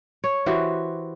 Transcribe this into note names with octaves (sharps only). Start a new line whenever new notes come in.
C#5
E3 F#4 G4 C5